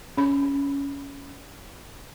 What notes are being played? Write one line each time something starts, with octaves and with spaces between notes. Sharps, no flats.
C#4 B5